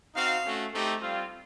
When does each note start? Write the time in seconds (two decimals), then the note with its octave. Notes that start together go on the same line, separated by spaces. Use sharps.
0.15 C4 D#4 F#4 F5
0.43 A3 C#4 F#4
0.72 A3 C4 D#4 G4
1.01 G3 C4 F4